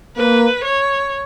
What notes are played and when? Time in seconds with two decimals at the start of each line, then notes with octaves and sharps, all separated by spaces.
0.17 A#3 B4
0.65 C#5